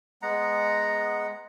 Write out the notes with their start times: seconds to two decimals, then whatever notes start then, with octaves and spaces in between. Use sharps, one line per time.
0.22 G#3 B3 F#5 A#5